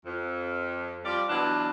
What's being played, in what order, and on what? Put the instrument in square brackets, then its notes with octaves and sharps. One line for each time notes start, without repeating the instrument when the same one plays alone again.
[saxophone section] F2
F3 G3 F4 D5
B2 E3 F#3 B3 D4 F4